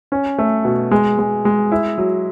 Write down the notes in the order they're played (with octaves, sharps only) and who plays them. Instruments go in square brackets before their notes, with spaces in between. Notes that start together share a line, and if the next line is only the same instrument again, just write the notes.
[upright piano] C#4
A3
B2
G#3
G#3
G#3
E4
F#3